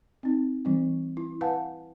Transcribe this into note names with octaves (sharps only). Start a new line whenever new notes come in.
C4 D#4
E3 G3 C4
E4
B4 F5 F#5 G#5 A5